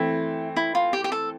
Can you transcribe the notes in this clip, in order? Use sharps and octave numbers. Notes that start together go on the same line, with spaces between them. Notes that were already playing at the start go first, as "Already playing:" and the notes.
Already playing: E3 A3 C4 E4
E4
F4
G4
G4
A4